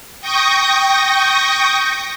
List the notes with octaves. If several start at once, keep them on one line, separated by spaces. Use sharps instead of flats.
G5 C#6 D#6 G6 A#6